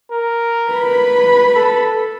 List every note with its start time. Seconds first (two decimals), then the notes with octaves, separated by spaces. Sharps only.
0.11 A#4
0.71 B4 B5
1.55 A4